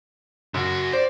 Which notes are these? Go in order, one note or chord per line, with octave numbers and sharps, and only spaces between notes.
F#2 C#3 F#4
C5 D5